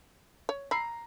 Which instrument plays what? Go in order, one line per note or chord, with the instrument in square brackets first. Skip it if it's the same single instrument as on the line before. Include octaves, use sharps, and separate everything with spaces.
[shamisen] C#5
[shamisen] E5 B5 [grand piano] A#5 C7